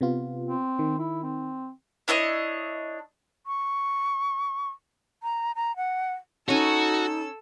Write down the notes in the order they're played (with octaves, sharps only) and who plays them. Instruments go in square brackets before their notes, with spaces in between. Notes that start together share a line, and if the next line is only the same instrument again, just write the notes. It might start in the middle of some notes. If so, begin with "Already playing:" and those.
[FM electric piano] C3 B3 F4
[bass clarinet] C4
[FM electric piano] D#3
[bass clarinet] E4
C4
[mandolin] D4 E4 C#5 D#5
[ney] C#6
A#5
A#5
F#5
[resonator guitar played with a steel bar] C#4 C#5 [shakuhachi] D#4 [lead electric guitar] F#4 [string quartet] A4 E6